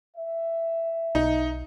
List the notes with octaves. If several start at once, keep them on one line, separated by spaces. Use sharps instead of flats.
E5
B1 D#4